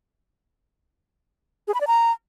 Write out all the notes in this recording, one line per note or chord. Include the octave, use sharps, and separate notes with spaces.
G#4
B5
D5
A#5